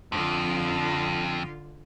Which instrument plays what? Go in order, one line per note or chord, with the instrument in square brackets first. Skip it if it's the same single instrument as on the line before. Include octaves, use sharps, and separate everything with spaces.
[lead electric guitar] F2 [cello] D3 F4